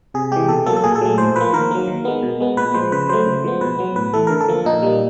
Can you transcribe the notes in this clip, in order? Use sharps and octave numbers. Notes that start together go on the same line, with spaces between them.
C3 G#4
E3 G#3 G4
B2 A4
F#3 A#3 A4
A4
A#2 G#4
A4
F#3 A3
A2 C5
F3 A#3 B4
D#3 A#4
F#3 A#3
D#3
G#3 B3
B2
G#3 B3
A#2 B4
F3 G#3 C5
C#3 B4
F#3 A3 C5
C#3
F3 G#3 B3
B2 B4
F#3 B3
A2 B4
E3 A3 A4
D3 A#4
A4
F3 A#3
A#2 D#4
G3 A#3